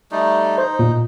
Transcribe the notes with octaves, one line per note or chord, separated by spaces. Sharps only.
G3 A3 D#4
D#4 C5
A#2